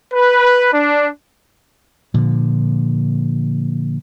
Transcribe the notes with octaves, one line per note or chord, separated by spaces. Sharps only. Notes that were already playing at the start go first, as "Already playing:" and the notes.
B4
D4
A#2 D3 F3